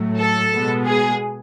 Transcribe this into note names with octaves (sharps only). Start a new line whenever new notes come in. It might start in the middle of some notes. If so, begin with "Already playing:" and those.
Already playing: A2 F#3 A3
A4
B2 G#3 B3
G#4